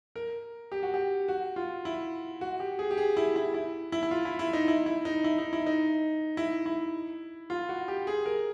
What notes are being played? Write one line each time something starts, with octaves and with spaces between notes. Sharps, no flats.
A#4
G4
F#4
G4
F#4
F4
E4
F#4
G4
G#4
G4
G#4
E4
E4
E4
E4
E4
F4
E4
E4
D#4
E4
E4
D#4
E4
D#4
E4
D#4
E4
E4
F4
F#4
G4
G#4
A#4